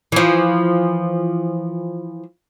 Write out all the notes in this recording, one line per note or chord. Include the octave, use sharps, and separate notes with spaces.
E3 F3